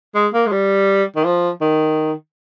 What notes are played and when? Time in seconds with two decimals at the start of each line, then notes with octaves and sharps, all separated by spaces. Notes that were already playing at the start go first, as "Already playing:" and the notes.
0.15 G#3
0.34 A#3
0.47 G#3
0.52 G3
1.16 D#3
1.25 F3
1.61 D#3